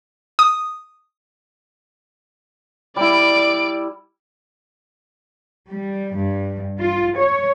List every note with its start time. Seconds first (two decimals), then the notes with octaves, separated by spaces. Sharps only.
0.39 D#6
2.96 G3 E4 D5 D7
5.69 G3
6.15 G2
6.81 F4
7.18 C#5